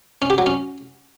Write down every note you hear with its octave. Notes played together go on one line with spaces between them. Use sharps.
C#4
G4
F#3
C#4